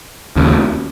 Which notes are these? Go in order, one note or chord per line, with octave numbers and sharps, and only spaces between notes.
D#2 C#3